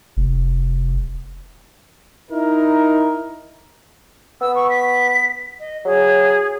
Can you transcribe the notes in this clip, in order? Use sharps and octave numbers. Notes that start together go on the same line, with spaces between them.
F1
D#4 E4 A#4
B3 E6
C#6
B6
D#5
F#3 G#4